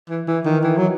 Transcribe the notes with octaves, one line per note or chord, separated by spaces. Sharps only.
E3
E3
D#3
E3
F#3